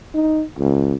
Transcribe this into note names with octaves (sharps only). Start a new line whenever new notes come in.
D#4
C#2